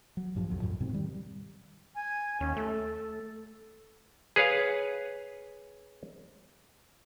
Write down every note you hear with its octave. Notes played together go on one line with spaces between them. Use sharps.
F#3
A#1 G2 F3
B1 F2 F3 F#3
F2 A2
G#2 B2 C4
D#3 G3
G#5
D#2 C#4
A3 A4
G#4 B4 C#5 F5